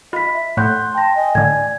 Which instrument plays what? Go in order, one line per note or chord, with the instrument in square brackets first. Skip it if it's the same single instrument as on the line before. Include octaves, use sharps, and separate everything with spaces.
[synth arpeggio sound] F4 [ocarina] D#5 [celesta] B5 B6
[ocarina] E5
[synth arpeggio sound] A2 [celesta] F#5 F#6 G6 [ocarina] C6
[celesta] G5 A#6 [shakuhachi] A5
[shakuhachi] D#5 [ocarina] G#5
[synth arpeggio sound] A2 D3 [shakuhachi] D5 [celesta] G#6